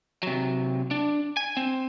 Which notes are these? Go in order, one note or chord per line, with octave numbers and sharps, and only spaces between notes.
C3 F#3
D4
G#5
C4